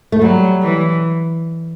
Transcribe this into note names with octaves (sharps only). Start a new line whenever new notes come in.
A3
F#3 G3
E3